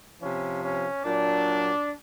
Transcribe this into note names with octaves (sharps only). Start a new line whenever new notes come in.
C3 F3 C#4
C#4
A#2 F#3 D4